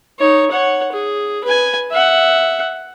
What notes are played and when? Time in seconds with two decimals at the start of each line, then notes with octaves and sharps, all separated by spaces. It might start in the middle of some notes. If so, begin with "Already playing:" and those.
0.19 D#4 C#5
0.51 C#5 F#5
0.92 G#4
1.45 B4 G#5
1.92 E5 F#5